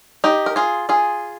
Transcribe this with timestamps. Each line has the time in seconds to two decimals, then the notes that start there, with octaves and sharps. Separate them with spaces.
0.24 D#4 G4
0.46 A#4
0.56 F4 G#4
0.89 F4 G#4